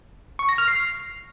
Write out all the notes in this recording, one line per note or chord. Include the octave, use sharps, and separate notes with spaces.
C#6
A#6
F6
C7